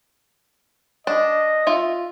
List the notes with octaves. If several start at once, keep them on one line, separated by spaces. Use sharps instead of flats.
D4 D#5
F4 E5